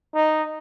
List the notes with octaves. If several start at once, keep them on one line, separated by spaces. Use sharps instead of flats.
D#4